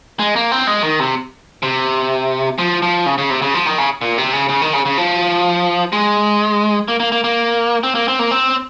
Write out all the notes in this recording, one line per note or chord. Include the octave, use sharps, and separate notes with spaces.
G#3
A#3
C4
G#3
D#3
C3
C3
F3
F3
C#3
C#3
C3
C#3
F3
D#3
C#3
A#2
C3
C#3
C#3
D#3
C#3
C#3
F3
G#3
A#3
A#3
A#3
A#3
C4
A#3
C4
A#3
C4